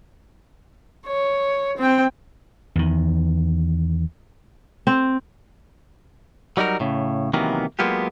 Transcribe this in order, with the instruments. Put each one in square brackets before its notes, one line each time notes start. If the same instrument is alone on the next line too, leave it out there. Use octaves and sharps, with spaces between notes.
[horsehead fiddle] C#5
C4 G5
[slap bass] E2 D#3
[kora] C4
[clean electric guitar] F#3 G3 D#4 F#4 A#4
A2 C#3
C3 D#3 E3 F#3 A#3 B3
F#3 G#3 A#3 B3 F4 G4